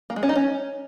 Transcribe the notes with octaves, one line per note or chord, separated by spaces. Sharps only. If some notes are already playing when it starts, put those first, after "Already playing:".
A#3
G#3
C#4
D#4
C#4